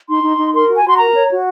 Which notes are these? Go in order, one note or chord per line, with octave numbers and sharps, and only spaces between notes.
D#4 C6
D#4
D#4
A#4 C6
F#4
G#5
F#4 C6
A#4 A#5
C#5
F#4